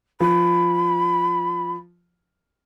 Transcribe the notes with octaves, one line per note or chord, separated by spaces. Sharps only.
F3 B5